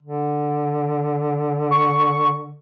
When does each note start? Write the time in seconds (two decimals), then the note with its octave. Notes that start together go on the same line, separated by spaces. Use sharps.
0.03 D3
1.71 C#6